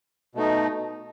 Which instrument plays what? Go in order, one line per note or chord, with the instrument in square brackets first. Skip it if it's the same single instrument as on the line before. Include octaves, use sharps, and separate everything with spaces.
[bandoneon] B2 A3 D#4